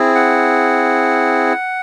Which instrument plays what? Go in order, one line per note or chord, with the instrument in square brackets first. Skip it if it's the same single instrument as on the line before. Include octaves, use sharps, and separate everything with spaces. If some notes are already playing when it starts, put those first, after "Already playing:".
Already playing: [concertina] C4 E4 G#4
F#5